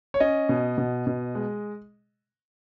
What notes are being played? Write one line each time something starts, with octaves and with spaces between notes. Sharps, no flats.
C#5
C#4 D#5
B2
B2
B2
G#3